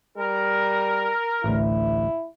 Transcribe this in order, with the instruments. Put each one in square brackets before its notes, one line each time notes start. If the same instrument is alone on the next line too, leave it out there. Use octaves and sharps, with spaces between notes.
[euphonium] G3 [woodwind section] A#4
[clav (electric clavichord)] A1 D2 [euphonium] E4